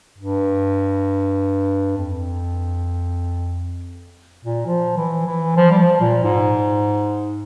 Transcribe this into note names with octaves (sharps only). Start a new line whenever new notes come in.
G2
F2
A#2
F3
E3
E3
F3
G3
F3
A#2
G#2